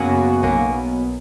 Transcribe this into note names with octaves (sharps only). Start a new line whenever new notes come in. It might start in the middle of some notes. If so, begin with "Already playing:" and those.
Already playing: F#2 C#3 F#3 A#3 B3 C#4 F#4
B1 B2 F#3 A#3 B3 C#4